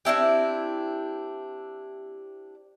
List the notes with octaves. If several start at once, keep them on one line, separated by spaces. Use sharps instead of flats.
C4 D4 E4 G4